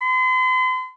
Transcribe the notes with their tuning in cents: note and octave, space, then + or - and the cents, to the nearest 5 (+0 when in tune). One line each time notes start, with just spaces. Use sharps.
C6 -40